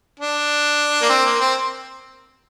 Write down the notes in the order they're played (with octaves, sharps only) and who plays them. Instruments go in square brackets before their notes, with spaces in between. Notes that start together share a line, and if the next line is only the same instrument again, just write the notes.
[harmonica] D4
A#3
C4
A#3
C4